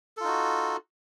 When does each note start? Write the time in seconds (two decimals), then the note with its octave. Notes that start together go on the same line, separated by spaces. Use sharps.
0.17 A4
0.21 F4
0.24 D#4
0.27 F#4